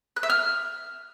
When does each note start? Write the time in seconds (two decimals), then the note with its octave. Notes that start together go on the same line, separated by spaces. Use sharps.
0.16 F#6
0.23 E5
0.30 F6